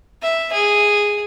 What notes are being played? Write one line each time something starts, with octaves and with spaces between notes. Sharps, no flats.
E5
G#4